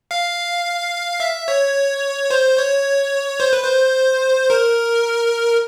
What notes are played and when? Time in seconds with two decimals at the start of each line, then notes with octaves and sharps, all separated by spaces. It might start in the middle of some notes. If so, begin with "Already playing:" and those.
0.11 F5
1.20 E5
1.48 C#5
2.30 C5
2.58 C#5
3.40 C5
3.53 B4
3.64 C5
4.50 A#4